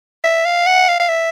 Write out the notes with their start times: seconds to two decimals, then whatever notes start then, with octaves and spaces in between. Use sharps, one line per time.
0.24 E5
0.45 F5
0.66 F#5
0.88 F5
1.00 F5
1.09 E5